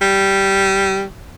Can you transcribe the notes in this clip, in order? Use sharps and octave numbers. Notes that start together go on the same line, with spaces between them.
G3